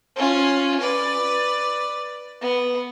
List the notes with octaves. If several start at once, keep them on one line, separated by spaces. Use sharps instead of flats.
C#4 F4
B4 D5
B3